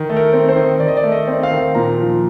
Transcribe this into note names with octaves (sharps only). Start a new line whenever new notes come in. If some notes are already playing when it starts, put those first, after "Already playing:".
Already playing: D#3
A3
A#4
C4
C5
D#3
D#3 D5
D#5
D5
A3
D#5
C4
F5
D#3
A#2 A#5
F3